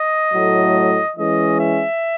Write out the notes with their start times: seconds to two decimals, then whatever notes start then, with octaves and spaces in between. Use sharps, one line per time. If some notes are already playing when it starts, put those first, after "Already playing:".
Already playing: D#5
0.33 A2 F#3 A3
1.17 E3 G#3 C#4 D#5
1.60 E5